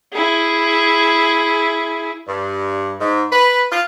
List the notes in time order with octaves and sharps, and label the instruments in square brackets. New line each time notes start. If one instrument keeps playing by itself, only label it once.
[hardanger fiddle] E4 G#4
[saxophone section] G2
G#2
B4
F4